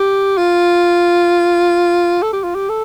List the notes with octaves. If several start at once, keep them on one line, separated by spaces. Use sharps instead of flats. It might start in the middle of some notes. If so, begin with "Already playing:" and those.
Already playing: G4
F4
A4
G4
F4
G4
A4